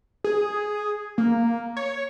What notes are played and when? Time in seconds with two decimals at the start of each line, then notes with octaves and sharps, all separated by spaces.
0.24 G#4
1.18 A#3
1.77 C#5